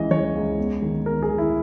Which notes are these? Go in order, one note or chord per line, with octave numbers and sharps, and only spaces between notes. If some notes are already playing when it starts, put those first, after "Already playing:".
Already playing: C#2 E3 D#5
E3 C#5
C#2
E2
D#3
E2 A#4
G#4
D#3
E4